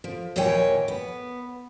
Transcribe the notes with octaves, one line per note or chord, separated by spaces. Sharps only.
F3
D#2 A#2 E3 C#5 G5 G#5
B3